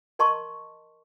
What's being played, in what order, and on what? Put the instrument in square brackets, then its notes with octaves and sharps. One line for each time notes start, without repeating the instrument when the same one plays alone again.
[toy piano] A#4 D#5 A5 C6 C#6